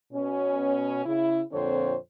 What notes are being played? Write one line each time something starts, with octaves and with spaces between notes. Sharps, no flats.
B2 C#4
C#3 E4
F2 A#2 D3 C4 C5 C#5